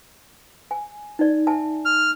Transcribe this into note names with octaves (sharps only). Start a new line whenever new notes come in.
G#5
D#4 D5
E5 G#5 A5
F6